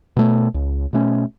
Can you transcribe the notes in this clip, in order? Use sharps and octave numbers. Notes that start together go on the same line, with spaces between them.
B2 A3
C#2
B2 A3 C#4